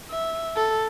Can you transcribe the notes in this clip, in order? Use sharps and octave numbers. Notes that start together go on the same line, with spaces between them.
E5
A4